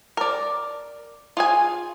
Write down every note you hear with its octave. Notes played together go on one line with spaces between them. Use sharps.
A#4 D5
F4 G#4 G#5